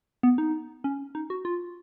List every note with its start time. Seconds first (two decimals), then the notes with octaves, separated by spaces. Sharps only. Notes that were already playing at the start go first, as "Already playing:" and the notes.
0.23 B3
0.38 D#4
0.84 C#4
1.15 D#4
1.30 F#4
1.45 F4